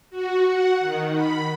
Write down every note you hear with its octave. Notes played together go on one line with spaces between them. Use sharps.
F#4
F#5
D#3
B5